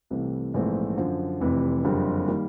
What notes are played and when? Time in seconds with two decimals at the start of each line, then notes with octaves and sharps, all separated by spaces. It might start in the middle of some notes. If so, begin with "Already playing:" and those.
0.10 C2 C3 E3 A3
0.54 A#1 G#2 E3 A3 C4
0.97 F#2 D3 F3
1.40 F1 F2 C3 E3
1.84 F#1 F2 D3 G3 C4
2.27 D#3 G3 A#3